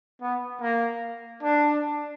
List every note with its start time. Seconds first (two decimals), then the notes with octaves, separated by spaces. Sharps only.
0.21 B3
0.61 A#3
1.43 D4